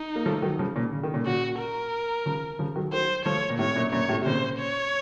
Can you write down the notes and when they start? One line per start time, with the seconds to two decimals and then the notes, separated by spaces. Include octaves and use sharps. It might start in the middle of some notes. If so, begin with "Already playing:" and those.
Already playing: D#4
0.16 A#3
0.26 F3 A3
0.42 D#3 F#3
0.59 C#3 F3
0.75 A#2 C#3
0.93 C#3
1.03 D#3
1.14 A#2 C#3
1.25 A#2 C#3 F#4
1.59 A#4
2.26 C#3 F3
2.59 C#3 F3
2.76 D#3 F#3
2.92 D#3 F#3 C5
3.25 F3 A3 C#5
3.50 A#2
3.59 A2 C3 C#5
3.76 F#2 A#2
3.92 F#2 A#2 C#5
4.09 A2 C3
4.22 C3
4.25 A#2 C#3 C5
4.59 C#5